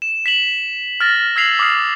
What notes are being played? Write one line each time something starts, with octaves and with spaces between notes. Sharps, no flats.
E7
B6 E7 F#7
F6 A6 A#6
E6 G#6 B6 C7 F7 F#7
D6 D#6 F6 C7